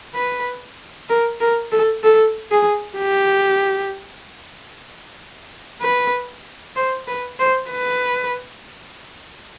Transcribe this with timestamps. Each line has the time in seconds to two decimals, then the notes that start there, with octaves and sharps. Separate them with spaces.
0.15 B4
1.09 A#4
1.41 A#4
1.72 A4
2.04 A4
2.52 G#4
2.98 G4
5.82 B4
6.76 C5
7.08 B4
7.39 C5
7.71 B4